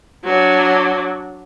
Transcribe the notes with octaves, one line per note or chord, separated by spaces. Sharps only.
F#3 D4